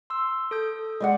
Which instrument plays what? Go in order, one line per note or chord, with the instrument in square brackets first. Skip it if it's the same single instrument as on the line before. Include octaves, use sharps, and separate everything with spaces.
[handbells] C6 E6
A4 D#6 G6
[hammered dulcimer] G#3 D5 F#5